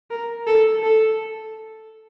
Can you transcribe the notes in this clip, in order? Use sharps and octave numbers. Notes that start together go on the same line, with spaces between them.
A#4
A4
A4